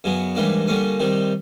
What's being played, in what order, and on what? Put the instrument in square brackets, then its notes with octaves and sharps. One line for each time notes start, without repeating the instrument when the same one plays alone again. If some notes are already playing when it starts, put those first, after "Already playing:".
[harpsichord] F#2 C#3 F#3 B3
G#2 E3 G3 A#3 D4
D3 G3 A#3 C#4
C3 D#3 G3